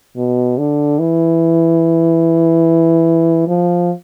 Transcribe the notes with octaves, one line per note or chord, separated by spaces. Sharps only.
B2
D3
E3
F3